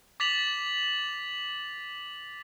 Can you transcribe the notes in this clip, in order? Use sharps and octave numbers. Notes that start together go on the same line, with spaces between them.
D6 A6 B6 F7 F#7